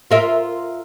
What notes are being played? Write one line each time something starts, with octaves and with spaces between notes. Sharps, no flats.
F4 A#4 E5